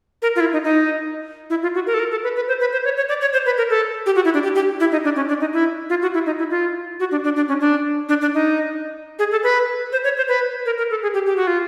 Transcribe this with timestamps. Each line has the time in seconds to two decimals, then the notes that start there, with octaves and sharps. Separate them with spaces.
0.22 A#4
0.36 F4
0.40 E4
0.53 D#4
0.64 D#4
1.50 E4
1.63 F4
1.75 F#4
1.87 A#4
1.94 A4
1.99 A#4
2.11 A4
2.24 B4
2.36 B4
2.48 C5
2.60 B4
2.73 C5
2.85 C#5
2.97 C#5
3.09 D5
3.21 C#5
3.33 C5
3.46 B4
3.58 A#4
3.70 A4
4.06 G4
4.15 F#4
4.25 E4
4.34 D4
4.43 G4
4.55 G4
4.80 E4
4.92 D#4
5.04 D4
5.16 C#4
5.28 D4
5.40 D#4
5.53 E4
5.90 F4
6.02 F#4
6.14 E4
6.26 D#4
6.38 E4
6.51 F4
7.00 F#4
7.11 D4
7.24 D4
7.36 D4
7.48 C#4
7.60 D4
8.09 D4
8.21 D4
8.34 D#4
9.19 G#4
9.31 A4
9.43 B4
9.92 C5
10.04 C#5
10.17 C5
10.28 B4
10.66 A#4
10.78 A#4
10.90 A4
11.02 G#4
11.14 G4
11.26 G4
11.37 F#4
11.47 F4